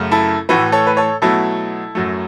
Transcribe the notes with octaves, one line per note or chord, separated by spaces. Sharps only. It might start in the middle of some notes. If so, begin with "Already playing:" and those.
Already playing: F#2 C#3 A3
E4 A4
A2 E3 A3 F#4 B4
A4 C#5
B4
A4 C#5
B2 F#3 A3 E4 A4
F#2 F#3 A3